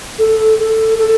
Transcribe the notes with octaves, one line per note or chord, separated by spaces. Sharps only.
A4
A4
A4